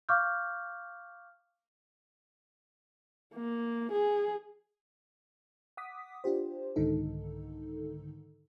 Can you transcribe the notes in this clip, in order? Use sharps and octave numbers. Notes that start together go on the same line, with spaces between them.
F5 C#6 D6 F6 G6
A#3
G#4
F#5 D6 D#6 B6
D4 F4 G4 C5
C2 G#2 D3 D#3 D#4 A4